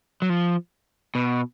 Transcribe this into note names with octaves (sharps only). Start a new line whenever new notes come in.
F#3
F3
B2